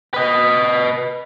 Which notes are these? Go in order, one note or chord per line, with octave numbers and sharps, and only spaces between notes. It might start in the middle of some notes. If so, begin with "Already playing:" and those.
B4 D#5